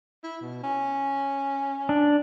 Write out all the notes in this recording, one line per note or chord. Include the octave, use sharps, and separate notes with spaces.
E4
B2
C#4
D4